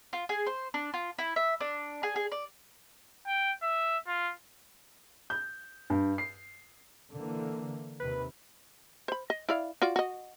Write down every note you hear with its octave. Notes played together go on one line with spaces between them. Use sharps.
F4
G#4
C5
D4
F4
E4
E5
D4
G#4
G#4
D5
G5
E5
F4
G6
G2
C7
D3 E3 A#3
D#2 C3 D#3 B4
C5 B5
D#5
E4 D5 F5
F4 F#4 D5
F#4 D#5